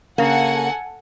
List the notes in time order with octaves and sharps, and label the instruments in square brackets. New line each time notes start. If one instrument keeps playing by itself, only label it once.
[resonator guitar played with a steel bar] C#3 A#3 [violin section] A4 F#5 G#5